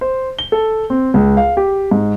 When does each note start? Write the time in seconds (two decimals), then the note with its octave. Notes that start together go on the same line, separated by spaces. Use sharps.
0.01 C5
0.39 G7
0.52 A4
0.90 C4
1.14 C#2
1.37 F5
1.57 G4
1.91 G#2